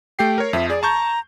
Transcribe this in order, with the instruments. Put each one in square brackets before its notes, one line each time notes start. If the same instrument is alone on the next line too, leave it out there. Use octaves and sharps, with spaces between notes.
[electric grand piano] A3 G4 C7 [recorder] G5
[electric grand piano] A#4 C#5
[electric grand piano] F2 F3 [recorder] E5
[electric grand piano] G#4 [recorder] D5
[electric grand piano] A5 C#6 G6 [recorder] A#5